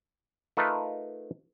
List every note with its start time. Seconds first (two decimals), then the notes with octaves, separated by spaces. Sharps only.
0.57 A3 D#4 F4 A#4 B4 A5